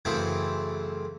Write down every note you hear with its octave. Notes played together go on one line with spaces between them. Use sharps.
F#2 C#3 E3 A3 C4 E4